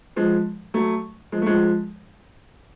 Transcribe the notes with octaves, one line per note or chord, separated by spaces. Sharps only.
F3 G#3
F#3 A3
F3 G#3
A3
F3 G#3